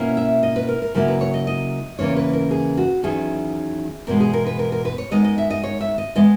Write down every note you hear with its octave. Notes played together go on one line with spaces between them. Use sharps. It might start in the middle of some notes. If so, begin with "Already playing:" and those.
Already playing: B2 A#3 C#4 E4
E5
D#5
B4
A#4
A#4
C#3 F#3 A#3 E4 A#4
B4
C#5
D#5
D#5
E2 C#3 E3 A#3 C#4 C#5
B4
A#4
G#4
F#4
E2 D#3 F#3 C#4 E4 G#4
E2 B2 G#3 A#4
G#4
A#4
B4
A#4
A#4
B4
C#5
D#3 G#3 B3 D#5
D#5
E5
D#5
C#5
E5
D#5
E3 G#3 B3 D#5